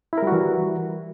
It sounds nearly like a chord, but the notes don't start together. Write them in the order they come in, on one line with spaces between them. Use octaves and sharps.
E4 A#4 G3 F#4 E3